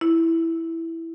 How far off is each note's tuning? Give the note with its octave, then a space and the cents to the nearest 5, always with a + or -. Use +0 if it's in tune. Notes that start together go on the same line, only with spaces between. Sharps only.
E4 +0